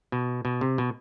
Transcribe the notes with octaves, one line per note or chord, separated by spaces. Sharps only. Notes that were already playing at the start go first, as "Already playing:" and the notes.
B2
B2
C3
B2